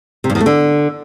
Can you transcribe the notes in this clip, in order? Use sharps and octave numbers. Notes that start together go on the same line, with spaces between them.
C3
G2
E2
A3
D3